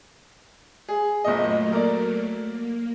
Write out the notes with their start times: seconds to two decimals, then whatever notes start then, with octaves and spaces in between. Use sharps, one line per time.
0.89 G#4
1.24 F#1 A#2 F#3 A3 A#3 D#5
1.72 A#4 D5
2.43 A#3